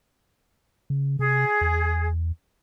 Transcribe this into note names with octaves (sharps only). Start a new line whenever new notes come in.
C#3
C3 G#4
E2